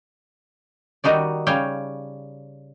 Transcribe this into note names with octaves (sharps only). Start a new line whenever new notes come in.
D#3 G3 D#4 F#4 D5
C#3 G3 C#5 F5 G5